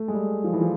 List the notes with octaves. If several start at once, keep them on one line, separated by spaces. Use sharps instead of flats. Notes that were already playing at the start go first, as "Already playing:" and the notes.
Already playing: A3
G#3
G3
F3
E3
F3